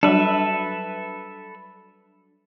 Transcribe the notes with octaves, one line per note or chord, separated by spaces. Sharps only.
F#3 G3 D4 A4 B4 E5